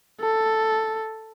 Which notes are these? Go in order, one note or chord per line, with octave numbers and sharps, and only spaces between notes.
A4